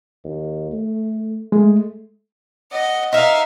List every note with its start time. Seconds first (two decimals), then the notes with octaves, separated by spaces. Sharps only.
0.24 D#2
0.72 A3
1.52 G#3 A3
2.72 D#5 F#5
3.13 D#4 A#4 E5 F5